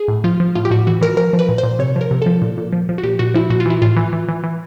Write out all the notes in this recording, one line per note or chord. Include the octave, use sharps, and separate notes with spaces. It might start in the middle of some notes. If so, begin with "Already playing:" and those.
Already playing: G#4
A2
F3 F4
F3
A2 F4
G4
A2 F#4
E3 F#4
E3 A#4
F3 A#4
F3
B4
A#2
C5
A#2
C3 C#5
F3
A#4
C3
F3 A4
A#2
A#2
F3
F3
F#4
A#2 G4
A#2 F#4
F3 E4
A#2 F#4
F4
E3 E4
A2 F4
E3
E3
E3
E3